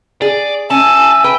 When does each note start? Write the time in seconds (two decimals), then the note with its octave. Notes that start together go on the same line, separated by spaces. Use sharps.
0.22 G#4 D5
0.70 C#4 E5 G#5 A5
1.24 B4 G5